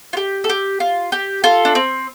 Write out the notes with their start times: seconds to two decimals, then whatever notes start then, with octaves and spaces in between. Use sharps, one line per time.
0.13 F4
0.17 G4
0.44 A4
0.49 G4
0.80 F4
1.12 G4
1.44 F4 A4
1.65 D4
1.75 C4